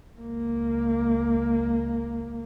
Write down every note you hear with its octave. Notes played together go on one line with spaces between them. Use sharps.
C#2 A#3